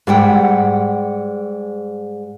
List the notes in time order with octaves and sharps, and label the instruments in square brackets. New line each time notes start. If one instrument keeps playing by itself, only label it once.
[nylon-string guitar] G#2 G3 F#5 G5